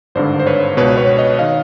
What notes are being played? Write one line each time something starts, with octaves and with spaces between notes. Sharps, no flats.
G#1 G2 D3 C5 D5
C5
B4 C#5
C#2 B2 B4 C#5
B4 C#5
C#5 D#5
D#3 D#5 F5